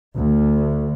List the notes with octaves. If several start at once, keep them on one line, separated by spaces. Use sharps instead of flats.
D2